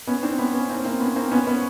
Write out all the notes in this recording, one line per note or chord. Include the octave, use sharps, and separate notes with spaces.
B3 C#4
C4 D4
B3 C#4
B3 C#4
A#3 C4
A#3 C4
B3 C#4
A#3 C4
B3 C#4
B3 C#4